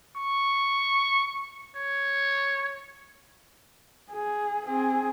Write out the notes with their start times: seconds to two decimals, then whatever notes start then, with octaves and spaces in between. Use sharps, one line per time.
0.16 C#6
1.76 C#5
4.12 G#4
4.66 C4 G#4